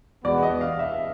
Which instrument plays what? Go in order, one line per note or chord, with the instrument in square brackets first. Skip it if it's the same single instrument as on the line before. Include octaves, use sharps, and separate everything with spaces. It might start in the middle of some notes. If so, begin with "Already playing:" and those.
[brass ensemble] E2 B2 G#3 B3 [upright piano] D5
[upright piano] D#5
F5
E5